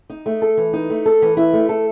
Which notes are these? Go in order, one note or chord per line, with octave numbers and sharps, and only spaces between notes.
D#4
A3
A4
E3
D#4
A3
A4
E3
E4
A3
A4